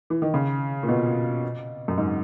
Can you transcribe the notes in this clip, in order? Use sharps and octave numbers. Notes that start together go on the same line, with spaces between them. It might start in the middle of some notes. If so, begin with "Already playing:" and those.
E3
D#3
C#3
A#2
B2
F#2
G#2